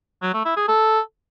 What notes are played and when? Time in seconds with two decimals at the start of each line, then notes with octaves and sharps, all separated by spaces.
0.22 F#3
0.34 A3
0.45 E4
0.57 G#4
0.68 A4